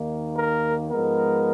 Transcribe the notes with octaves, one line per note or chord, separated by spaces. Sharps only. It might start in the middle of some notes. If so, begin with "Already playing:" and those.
Already playing: D#2 D#3 A#3
A#4
G#2 F3 G#3 B3 A#4